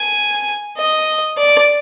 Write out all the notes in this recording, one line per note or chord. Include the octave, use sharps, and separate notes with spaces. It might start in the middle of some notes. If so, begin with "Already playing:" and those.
Already playing: G#5
D#5
D5